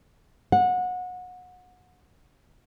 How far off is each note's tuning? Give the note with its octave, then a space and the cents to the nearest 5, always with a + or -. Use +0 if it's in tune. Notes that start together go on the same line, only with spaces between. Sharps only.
F#5 -25